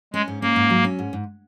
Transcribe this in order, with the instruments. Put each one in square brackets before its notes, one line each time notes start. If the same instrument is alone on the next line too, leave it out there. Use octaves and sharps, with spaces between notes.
[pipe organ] G#3 [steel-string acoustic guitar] C#4
[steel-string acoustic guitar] G#2
[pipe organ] A#3 [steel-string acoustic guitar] C#4
[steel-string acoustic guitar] G#2
F#3
C#4
G#2
G#2